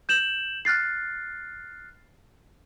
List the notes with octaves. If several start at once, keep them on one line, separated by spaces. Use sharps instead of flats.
G6 E7 F#7
F6 F#6 A6 C7